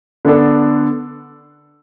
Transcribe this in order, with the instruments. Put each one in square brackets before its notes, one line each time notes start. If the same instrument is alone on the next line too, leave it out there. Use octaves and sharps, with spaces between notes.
[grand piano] D3 B3 D4 A4